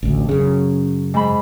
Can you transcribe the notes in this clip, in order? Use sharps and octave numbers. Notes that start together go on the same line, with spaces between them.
A1 D2
F#2 C#3
G#2 B5